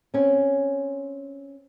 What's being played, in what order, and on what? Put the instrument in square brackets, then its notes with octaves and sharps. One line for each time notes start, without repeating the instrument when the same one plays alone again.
[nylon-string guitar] C4 C#4